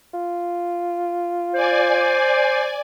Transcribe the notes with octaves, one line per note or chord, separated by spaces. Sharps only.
F4
C5 D5 G#5